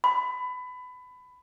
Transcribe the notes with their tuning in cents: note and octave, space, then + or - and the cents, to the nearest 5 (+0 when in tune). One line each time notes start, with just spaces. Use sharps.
B5 +20